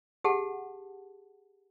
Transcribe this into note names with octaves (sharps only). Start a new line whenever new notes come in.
G4 G#4 F#5 A5